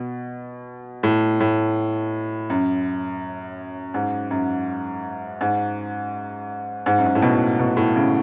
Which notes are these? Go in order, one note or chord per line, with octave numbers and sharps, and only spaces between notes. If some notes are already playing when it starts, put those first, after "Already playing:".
Already playing: B2
A2
A2
F#2
G#2
F#2
G#2
G#2
F#2
G#2
A2
B2
B2
A2
C#3